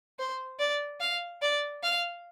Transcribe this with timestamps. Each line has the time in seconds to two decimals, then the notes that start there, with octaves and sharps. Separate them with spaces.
0.19 C5
0.60 D5
1.01 F5
1.42 D5
1.83 F5